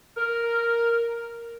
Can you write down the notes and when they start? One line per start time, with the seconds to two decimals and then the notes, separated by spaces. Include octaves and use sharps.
0.17 A#4